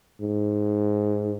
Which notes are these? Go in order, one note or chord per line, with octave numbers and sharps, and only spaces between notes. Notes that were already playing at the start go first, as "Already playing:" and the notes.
G#2